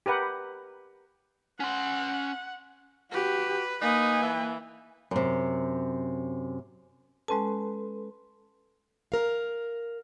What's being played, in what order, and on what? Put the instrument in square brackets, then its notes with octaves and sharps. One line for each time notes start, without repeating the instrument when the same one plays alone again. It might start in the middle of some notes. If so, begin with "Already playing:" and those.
[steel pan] G4 A#4 B4 F#5
[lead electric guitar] C#4 C6 [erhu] F#5
[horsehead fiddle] F#4 G4 [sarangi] B4
[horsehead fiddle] A#3 G#5 [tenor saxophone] D#4 [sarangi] B4
[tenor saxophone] E3
[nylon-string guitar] F#2 C3
[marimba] G#3 C#4 A5 [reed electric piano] A4 B4 C6
[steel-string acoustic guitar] A#4 F5